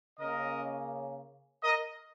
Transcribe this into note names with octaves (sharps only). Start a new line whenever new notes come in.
C#3 A#3 C#4 A#4 D#5
A#4 D#5